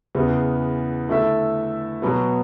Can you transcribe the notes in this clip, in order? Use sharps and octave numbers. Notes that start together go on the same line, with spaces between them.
E2 C#3 E3 B3
D3 A3 E4 A4 E5
B2 F#3 B3